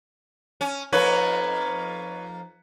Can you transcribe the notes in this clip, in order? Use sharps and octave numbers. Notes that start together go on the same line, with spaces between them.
C#4
F2 A#3 D#4 B4 C#5